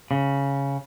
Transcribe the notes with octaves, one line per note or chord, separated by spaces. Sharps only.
C#3